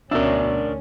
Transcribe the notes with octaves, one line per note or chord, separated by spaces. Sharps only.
D2 B2 C#4 D4 A#4 D5 E5 E6